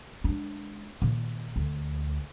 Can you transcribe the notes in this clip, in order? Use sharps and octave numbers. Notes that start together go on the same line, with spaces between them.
G#3 D4
A#2 D#3
D2